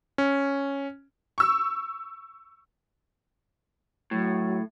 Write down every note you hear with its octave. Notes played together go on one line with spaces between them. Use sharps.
C#4
C#6 E6
A2 F#3